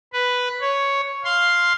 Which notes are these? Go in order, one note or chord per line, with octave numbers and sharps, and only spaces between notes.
B4
C#5
F5 C6